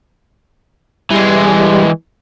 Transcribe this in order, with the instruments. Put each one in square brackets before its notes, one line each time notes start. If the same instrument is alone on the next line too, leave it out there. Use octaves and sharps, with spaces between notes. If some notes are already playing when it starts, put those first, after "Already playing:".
[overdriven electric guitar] E3 G#3 [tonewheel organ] G3